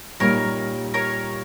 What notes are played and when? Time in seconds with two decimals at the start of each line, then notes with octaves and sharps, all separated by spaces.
0.20 A#2 G3 A#3 D#4 A#4 C#5
0.94 A#4 C#5